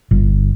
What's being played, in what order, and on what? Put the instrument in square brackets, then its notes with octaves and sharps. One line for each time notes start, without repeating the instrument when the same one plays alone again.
[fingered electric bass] G1